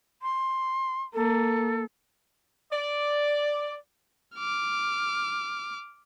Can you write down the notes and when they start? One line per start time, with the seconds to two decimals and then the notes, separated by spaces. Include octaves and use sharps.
0.22 C6
1.14 A#3 A4
2.72 D5
4.35 D6 F6